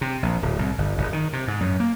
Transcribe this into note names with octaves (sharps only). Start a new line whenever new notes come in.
C3
A#1
D1
C2
G1
F#1
D#3
C3
G#2
F#2
A#3